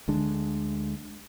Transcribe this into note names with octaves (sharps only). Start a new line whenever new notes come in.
D2 D3 G#3 D4